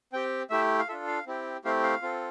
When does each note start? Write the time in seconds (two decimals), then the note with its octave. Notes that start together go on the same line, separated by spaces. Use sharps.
0.13 C4 G4 G5
0.50 A3 E4 G4 E5
0.79 F5
0.88 D4 F4 A4 E5
1.07 F5
1.27 C4 E4 G4
1.65 A3 C4 E4 G4 F5
1.83 F5
2.02 C4 F4 A4